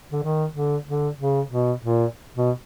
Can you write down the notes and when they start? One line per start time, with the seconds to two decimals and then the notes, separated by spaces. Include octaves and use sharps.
0.12 D3
0.23 D#3
0.54 D3
0.87 D3
1.19 C#3
1.50 B2
1.83 A#2
2.36 B2